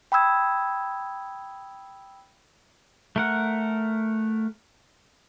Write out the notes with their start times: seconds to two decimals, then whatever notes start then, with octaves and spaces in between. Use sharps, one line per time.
0.12 G5 B5 D#6 E6 G#6
3.16 A3 A#4 F#5